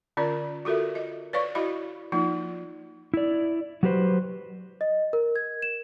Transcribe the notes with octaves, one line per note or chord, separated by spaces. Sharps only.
D3 C#4 F4 A#4 D5
F4 F#4 A4 A#4 E5
D#5
B4 C#5 D5 F5 C#6
E4 F#4 D#5 F5 B5
F3 A#3 D#4 F4
E4 D5
F#3 F#4 G4 B4 C5
D#5
A#4
G#6
E7